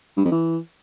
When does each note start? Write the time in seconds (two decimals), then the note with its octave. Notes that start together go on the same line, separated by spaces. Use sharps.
0.17 G2
0.24 F2
0.32 E3